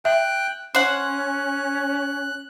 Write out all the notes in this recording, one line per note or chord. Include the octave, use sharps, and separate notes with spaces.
E5 G5 F#6
C#4 C5 F#5 F#6